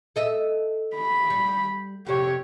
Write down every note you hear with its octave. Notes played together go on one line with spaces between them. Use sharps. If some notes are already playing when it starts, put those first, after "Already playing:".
A4 D#5 E5
B5
G3
F2 C3 G4 C#5